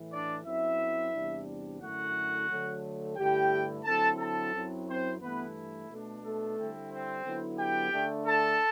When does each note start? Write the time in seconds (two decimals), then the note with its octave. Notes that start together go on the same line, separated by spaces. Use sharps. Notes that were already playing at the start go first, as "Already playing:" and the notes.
Already playing: A2 E3
0.11 D4 D5
0.45 F#2 F#3 C4 E4 E5
1.13 E2 C3 G3 D4
1.81 F#2 D3 A3 E4 F#4 F#5
2.49 D3 F#3 A3
3.16 G2 D3 A3 E4 G4 G5
3.84 D3 F#3 C4 E4 A4 A5
4.18 A4 A5
4.52 F#2 F#3 C4 E4
4.87 C4 C5
5.21 G2 E3 A3 B3 E4 B4
5.89 B2 A3 D4
6.23 A3 A4
6.57 D3 G3 C4 E4
6.91 C4 C5
7.24 D3 F#3 B3 E4
7.59 G4 G5
7.92 D3 A3 D4
8.26 A4 A5